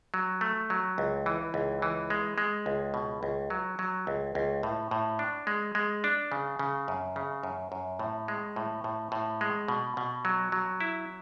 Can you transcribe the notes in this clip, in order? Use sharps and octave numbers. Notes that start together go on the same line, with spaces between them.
F#3
A3
F#3
C#2
E3
C#2
E3
G#3
G#3
C#2
B2
C#2
F#3
F#3
C#2
C#2
A2
A2
D4
G#3
G#3
D4
C#3
C#3
F#2
C#3
F#2
F#2
A2
G#3
A2
A2
A2
G#3
B2
B2
F#3
F#3
E4